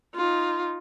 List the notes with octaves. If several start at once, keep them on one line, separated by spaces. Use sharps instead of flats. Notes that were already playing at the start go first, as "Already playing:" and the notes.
D#4 F4